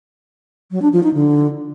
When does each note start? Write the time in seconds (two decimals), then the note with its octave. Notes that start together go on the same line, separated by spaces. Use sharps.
0.71 F#3
0.82 D4
0.93 F3
1.03 D#4
1.14 D3